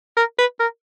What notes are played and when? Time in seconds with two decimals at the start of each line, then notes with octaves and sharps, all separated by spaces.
0.17 A#4
0.38 B4
0.60 A#4